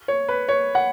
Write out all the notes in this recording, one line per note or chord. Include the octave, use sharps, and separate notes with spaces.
C#5
B4
C#5
F#5